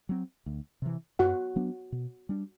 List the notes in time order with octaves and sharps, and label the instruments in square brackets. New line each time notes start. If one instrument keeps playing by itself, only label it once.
[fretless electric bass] F#3 C4
D2
C3 E3
[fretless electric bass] F#2 [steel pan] F#4 F#5
[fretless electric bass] F#3 B3 D4
B2
G3 D4